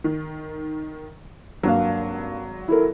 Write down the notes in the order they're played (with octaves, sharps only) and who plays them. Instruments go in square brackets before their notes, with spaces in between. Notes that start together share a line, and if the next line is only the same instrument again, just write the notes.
[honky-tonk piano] D#3
[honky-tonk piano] G#1 F#3 [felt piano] G2 A#3 F5
[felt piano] E4 A4 A#4